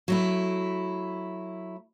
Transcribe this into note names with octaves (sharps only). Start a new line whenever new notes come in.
F#3 A3 E4